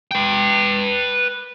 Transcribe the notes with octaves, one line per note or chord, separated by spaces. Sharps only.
B4 G5